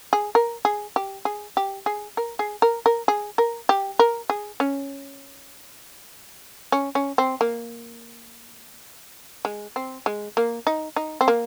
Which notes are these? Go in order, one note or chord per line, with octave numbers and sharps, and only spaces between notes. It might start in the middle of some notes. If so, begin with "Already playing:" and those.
G#4
A#4
G#4
G4
G#4
G4
G#4
A#4
G#4
A#4
A#4
G#4
A#4
G4
A#4
G#4
C#4
C#4
C#4
C4
A#3
G#3
C4
G#3
A#3
D#4
D#4
C4
A#3